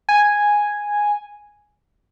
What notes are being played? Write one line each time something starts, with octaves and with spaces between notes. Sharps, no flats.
G#5